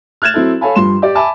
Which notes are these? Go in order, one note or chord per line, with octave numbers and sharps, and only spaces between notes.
F6 F#6 G#6 A6 E7
F#3 C4 E4 A4
A4 C#5 F5 G#5 A5 B5
G2 F3 G3 C6 E7
G4 D5
E5 G#5 A5 B5 D6